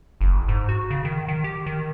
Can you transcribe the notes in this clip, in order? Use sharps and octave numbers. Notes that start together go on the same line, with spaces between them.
F#1
G#2
F#4
C#3
D#3
D#3
G4
D#3